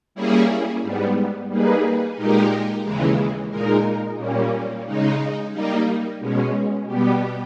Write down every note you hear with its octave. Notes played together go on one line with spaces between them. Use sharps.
G3 A#3 C#4 E4 G#4
G#2 G3 B3
G3 A#3 D#4 G#4 B4
A#2 G#3 D#4 G4 A#4
D#2 C#3 E3 G#3
A#2 G#3 D#4 A#4
A#2 G3 A#3 C#4
C#3 G#3 D#4
G3 A#3 D#4
B2 G#3 C#4
B2 G3 B3 G4